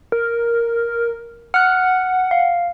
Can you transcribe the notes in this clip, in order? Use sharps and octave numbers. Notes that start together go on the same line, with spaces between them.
A#4
F#5 F6 F#6
F5